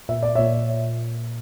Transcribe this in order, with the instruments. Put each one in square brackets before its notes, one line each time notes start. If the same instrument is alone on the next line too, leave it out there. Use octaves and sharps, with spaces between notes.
[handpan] A#2 [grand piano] E5
[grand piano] D5
[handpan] A#2 [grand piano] C#5 E5